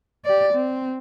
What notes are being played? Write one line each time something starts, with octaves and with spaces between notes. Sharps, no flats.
G4 D5
C4